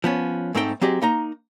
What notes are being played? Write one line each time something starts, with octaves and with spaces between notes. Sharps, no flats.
F3 B3 C#4
G#2 A3 C4 D#4 G#4 G5
F#3 C4 G4 G#4 D#5
A#3 D#4 A#5